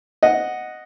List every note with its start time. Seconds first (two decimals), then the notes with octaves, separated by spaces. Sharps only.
0.23 D#5 F#5